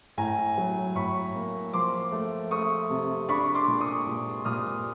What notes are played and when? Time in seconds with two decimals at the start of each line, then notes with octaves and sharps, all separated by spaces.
0.18 A2 G#5 A#5
0.58 F#3
0.95 A2 B5 C#6
1.35 A#3
1.73 F3 C6 D6
2.12 A3
2.51 A3 C#6 D#6
2.90 C3
3.28 D4 B5 C#6
3.54 C6 D6
3.68 A#2
3.81 C#6 D#6
4.07 A#2
4.45 A#2 D#6 F6